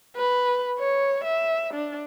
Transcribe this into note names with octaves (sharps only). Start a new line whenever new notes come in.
B4
C#5
E5
D4